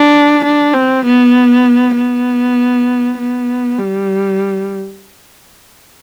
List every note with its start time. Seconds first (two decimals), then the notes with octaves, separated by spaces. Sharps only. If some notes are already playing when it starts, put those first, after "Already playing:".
Already playing: D4
0.44 D4
0.74 C4
1.05 B3
1.96 B3
3.18 B3
3.79 G3